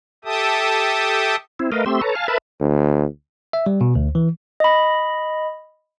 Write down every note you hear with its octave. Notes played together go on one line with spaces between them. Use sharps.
G4 A4 E5 G5 A5 D#6
C4 E4
A3 A#4 B4 D#5 F5
A3 C4 G4 C6 E6
A4 B4 C#5 A5 A#5
F5 G#5 A5 F6
A#4 B4 E5 A5 B5
D2
E5
G3
B2
D2
E3
D#5 B5